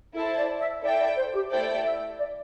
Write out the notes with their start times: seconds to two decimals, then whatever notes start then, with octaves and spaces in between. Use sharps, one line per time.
0.15 E4 A4 C5 A5
0.37 D5
0.60 E5
0.82 E4 A4 D5 E5 G5
0.99 D5
1.17 C5
1.34 G4
1.51 A3 E4 A4 C5 D5 G5
1.84 E5
2.19 D5